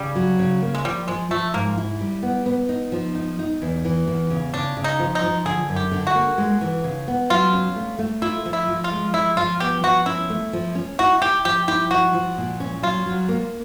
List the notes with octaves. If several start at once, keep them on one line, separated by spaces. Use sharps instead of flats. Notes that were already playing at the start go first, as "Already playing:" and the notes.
Already playing: C#3 G3
F#3
C#3
A#3
G#3
F3 G3
F3 G#3
F3 A3
G#2 A#3
E4
G3
B3
B3
D#4
F3
D#4
D#4
E2
E3
E2
C#3
C#3 D4
C#3
D#4
F3
D#4
F3
D3 G#4
F#2
G4
D3
F#4
A#3
G#3
E3
C#3
B3
F#3 F4
C#4
A3
A3
E4 F4
F3
E4
F3
F4
G#3
F3 E4
F3 F4
B3 G4
F3 F#4
C#4 E4
A3
F3
C#4
E4 F#4
E4 G4
F3 G4
E4 G4
F3 F#4
F3
A#2
C#4
F#3 F4
F#3
A#3